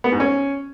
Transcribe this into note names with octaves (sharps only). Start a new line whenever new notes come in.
B3
G#2
C#4